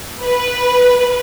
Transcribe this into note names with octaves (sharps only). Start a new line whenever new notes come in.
B4